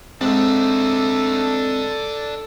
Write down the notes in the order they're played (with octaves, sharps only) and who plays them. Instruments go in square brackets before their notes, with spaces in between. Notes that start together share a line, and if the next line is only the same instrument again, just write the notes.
[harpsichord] G#2 [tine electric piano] C4 [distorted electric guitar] D4 E5 [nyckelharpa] A4